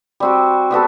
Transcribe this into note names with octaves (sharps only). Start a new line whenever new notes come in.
G3 C4 F#4
G3 B3 F#4 A4